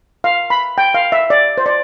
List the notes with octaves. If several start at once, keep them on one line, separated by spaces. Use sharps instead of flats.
F5
B5
G5
F5
E5
D5
C5
D5